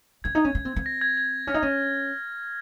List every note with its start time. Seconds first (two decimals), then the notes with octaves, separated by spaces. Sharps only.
0.24 C#4 G#6
0.35 D#4
0.45 C#4
0.55 C#4
0.65 C4
0.76 C4
0.86 A#6
1.01 G#6
1.17 G#6
1.47 C#4 F6
1.54 D#4
1.62 C#4